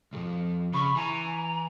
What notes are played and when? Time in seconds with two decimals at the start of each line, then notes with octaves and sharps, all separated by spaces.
0.13 C2 F2
0.74 C#3 B5 C#6
0.96 E3 G#5 A#5